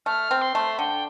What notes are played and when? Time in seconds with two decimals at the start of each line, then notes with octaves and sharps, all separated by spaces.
0.06 A3 F6
0.31 C4
0.42 C6
0.55 A3
0.79 D3 G5